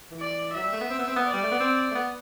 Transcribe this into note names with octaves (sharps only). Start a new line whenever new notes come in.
E3
D5
F#3 E5
G3
A3
B3
C4
B3
C4
B3
D5
G3
A3
B3
C4
A3
B3